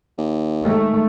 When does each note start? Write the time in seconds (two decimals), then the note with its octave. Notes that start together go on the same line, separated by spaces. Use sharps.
0.18 D#2
0.63 D#3 G#3 A3